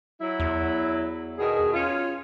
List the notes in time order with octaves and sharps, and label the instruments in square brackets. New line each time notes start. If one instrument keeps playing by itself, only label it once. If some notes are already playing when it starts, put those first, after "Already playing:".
[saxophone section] F#3 E4
[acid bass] E2
[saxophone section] B2 D#3 G#4
C#4 F4